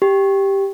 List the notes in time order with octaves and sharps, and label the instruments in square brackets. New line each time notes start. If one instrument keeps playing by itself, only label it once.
[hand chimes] G4